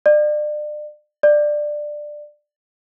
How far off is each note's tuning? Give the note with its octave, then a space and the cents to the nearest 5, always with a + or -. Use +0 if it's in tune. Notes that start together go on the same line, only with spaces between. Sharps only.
D5 +35
D5 +15